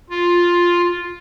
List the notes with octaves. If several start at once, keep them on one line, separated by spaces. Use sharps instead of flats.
F4